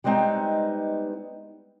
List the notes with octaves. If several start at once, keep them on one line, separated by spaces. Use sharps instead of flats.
G3 G#3 B3 C4 D#4